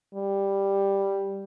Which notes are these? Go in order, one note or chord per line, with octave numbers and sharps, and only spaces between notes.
G3